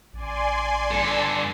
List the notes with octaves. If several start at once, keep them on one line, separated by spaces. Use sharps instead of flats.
A1 D5 G#5 C6
G2 A4